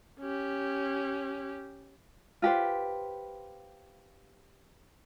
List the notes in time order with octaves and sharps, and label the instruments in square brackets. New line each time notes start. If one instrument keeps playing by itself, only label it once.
[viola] C#4 G4
[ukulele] F4 G4 B4 C5